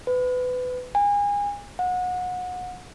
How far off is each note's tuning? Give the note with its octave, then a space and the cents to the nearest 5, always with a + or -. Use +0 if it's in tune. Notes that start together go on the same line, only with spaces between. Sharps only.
B4 +25
G#5 -30
F#5 -30